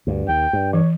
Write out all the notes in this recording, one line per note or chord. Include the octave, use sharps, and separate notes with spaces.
D2 G2
D#2 G5
G2
E3 C#5